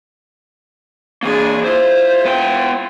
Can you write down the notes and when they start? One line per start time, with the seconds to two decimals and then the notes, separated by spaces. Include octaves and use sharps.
1.23 E3 A#3 D4 G#4
1.64 E4 F4 C5
2.25 B3 G5